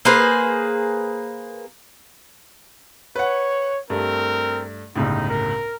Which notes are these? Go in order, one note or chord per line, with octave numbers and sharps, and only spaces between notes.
A#3 G#4 B4 C5
B4 C#5 F#5
G2 A3 C4 A#4
G1 C#2 A2 D#4
A#4